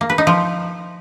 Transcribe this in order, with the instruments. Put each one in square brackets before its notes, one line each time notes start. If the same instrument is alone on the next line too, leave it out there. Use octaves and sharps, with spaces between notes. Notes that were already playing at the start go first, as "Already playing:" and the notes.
[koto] A#3
B4
D#4
F3